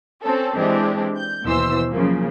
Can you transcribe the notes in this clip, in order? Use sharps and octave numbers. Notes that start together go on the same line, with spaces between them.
C4 C#4 A4
E3 G#3 C4 D4 G4
G6
D#2 B2 E3 C5 E6
C#3 F3 F#3 A#3